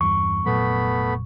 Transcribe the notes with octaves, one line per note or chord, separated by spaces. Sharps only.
E2 G2 C#6
F1 A#2 F#3 A3 B3 B5